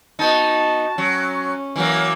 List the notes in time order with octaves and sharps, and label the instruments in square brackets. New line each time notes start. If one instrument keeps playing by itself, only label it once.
[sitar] B3 D#4 [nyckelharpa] F#4 A5
[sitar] F#3 [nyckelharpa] C#4
[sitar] E3 F#3 A#3